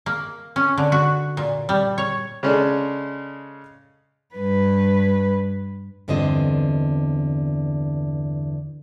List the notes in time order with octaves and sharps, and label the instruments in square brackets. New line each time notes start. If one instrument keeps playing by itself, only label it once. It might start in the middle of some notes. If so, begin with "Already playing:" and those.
[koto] A#3
C#4
D3
F#4
A#2
G3
C#5
[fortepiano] C#3 G#3 C#4 D4 A4
[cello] G2 B4
[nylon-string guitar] E2 G2 D3 C4 F4 D#5